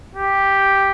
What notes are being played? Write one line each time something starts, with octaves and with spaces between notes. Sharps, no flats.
G4